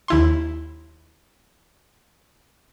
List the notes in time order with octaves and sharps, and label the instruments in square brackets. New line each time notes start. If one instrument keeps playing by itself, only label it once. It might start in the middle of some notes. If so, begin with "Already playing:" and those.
[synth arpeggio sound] D#2 E4 C6